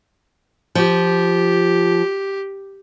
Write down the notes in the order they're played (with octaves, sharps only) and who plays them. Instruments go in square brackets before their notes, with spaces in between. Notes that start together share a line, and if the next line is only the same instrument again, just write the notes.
[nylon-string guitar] F3 [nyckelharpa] G4